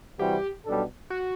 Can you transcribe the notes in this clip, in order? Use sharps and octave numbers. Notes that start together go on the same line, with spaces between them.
C3 E3 G3 C4 F#4 G4
B1 B2 G3 D4 A4
F#4